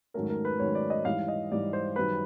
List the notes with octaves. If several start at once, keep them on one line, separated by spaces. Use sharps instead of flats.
G#2 D#3 F#3 A3 C#4 A#4
A#4
B4
G#2 D#3 F#3 A3 C#4 C#5
D5
D#5
G#2 E3 G3 F5
D#5
G#2 E3 G3 D5
C5
F#2 D#3 G3 B4